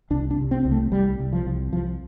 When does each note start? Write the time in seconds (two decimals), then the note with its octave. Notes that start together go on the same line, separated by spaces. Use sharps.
0.10 C2 D4
0.31 D4
0.38 C3
0.51 C4
0.65 C2
0.71 A3
0.92 C2 G3
1.19 C2
1.33 F3
1.46 C2
1.73 C2 F3